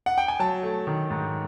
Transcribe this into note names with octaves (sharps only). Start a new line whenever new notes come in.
F#5
G5
G#5
F#3 A5
A3
D#3
G#2